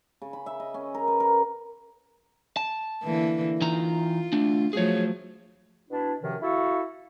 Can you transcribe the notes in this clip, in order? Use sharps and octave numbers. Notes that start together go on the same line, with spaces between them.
C#3
B5
E5
D#5
C#4
A#4
B4
A#4
A5
D3 E3 A#3
E3 D#4 F4 A#5
D3 A3 D4
F3 F#3 A3 G#4 C#5
B2 D4 E4
F#2 C3 D#3 F3
E4 F#4 A4 F5